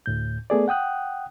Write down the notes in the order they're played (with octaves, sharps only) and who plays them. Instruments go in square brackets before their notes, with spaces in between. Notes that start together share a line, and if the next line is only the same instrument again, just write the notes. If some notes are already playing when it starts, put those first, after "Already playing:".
[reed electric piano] D2 A2 G6
A3 B3 G#4 D5
F#5 G5 D#6 F#6